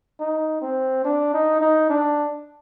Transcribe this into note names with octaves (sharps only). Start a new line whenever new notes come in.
D#4
C4
D4
D#4
D#4
D4